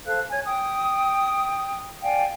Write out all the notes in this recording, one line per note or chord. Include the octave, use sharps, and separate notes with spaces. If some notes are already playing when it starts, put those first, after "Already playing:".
A4 C5 F5 F#6
C#5 G#5 G#6
G5 D#6
D5 F5 G5 G#5